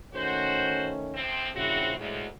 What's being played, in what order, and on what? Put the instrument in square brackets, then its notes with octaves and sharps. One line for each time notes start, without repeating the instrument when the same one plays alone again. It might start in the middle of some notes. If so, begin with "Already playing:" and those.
[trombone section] D#3 A3 C#4 [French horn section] F#4 C5
[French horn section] A2 F3 C4
[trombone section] A#1 C#3 E4 [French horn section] C4 F#4
[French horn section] D2 [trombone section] A2 G#3